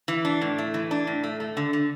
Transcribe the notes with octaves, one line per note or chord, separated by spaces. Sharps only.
E3
D4
A2
A3
E3
D4
A2
A3
A3
D3
D3